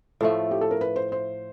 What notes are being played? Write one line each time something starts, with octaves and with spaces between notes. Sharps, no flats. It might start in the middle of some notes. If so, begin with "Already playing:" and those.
A2 F3 A3 A4
G4
A4
A#4
B4
C5
C5